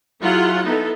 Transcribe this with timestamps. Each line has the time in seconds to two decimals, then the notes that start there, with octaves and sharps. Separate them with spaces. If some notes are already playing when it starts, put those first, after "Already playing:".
0.21 F#3 E4 F4 G#4 F#5
0.62 B3 D#4 E4 A4